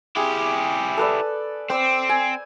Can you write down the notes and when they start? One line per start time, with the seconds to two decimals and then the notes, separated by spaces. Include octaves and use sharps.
0.16 E4 G4 G#4
0.97 A4 B4 D5
1.70 C4 C5 D5 E6
2.09 G#5